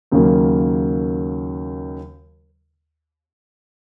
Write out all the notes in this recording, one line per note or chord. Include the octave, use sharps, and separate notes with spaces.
D#2 C#3 F#3 A#3